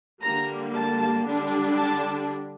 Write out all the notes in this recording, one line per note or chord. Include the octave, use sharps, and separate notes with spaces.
D3 G3 A#3 A#5
A5
D3 G3 D4
A5